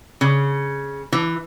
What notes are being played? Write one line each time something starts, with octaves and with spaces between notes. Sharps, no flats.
C#3
E3